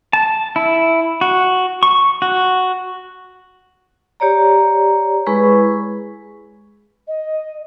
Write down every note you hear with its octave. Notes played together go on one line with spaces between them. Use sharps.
A5
E4
F#4
C#6
F#4
G4 C#5 D5 A#5
G#3 E4 G#4 B4 B5 C#6
D#5